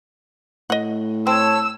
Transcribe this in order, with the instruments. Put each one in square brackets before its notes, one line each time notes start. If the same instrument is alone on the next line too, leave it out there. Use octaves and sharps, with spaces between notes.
[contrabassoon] A2 [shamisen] D#5 F#5
[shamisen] C4 [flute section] C#5 A5 [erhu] E6